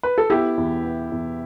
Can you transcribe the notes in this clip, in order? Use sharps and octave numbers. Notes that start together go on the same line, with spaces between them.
B4
A4
B3 E4 G4
E2
B3
E2